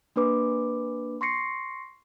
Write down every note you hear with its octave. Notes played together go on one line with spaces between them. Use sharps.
A#3 D4 B4 D6
C6 C#6 A#6 C7 C#7